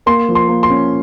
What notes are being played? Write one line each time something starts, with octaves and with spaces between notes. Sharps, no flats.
A#3 C6
F3
C6
A#3
C6
C#4